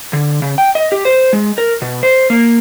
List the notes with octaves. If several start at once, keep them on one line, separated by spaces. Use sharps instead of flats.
D3
C#3
G5
D#5
G4
C5
G#3
A#4
B2
C5
A#3